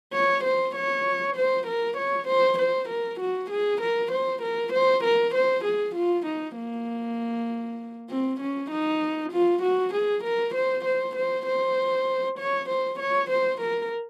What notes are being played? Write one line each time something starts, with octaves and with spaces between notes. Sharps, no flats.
C#5
C5
C#5
C5
A#4
C#5
C5
C5
A#4
F#4
G#4
A#4
C5
A#4
C5
A#4
C5
G#4
F4
D#4
A#3
C4
C#4
D#4
F4
F#4
G#4
A#4
C5
C5
C5
C5
C#5
C5
C#5
C5
A#4